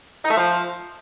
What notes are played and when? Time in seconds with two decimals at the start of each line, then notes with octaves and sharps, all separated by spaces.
0.24 D#4
0.31 A3
0.37 F3